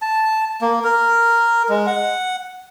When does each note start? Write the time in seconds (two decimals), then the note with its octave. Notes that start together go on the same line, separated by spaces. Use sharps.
0.02 A5
0.62 A#3
0.84 A#4
1.69 G#3
1.87 F#5